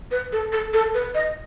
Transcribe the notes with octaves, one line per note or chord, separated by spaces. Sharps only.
B4
A4
A4
A4
B4
D#5